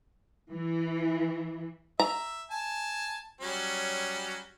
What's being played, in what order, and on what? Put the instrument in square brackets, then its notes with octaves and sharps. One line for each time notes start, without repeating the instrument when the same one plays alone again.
[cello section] E3
[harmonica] E5 [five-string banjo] A#5
[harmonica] G#5 A5
F#3 G3 C#4